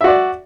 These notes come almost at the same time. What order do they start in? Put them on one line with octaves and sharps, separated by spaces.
E5 F#4 D5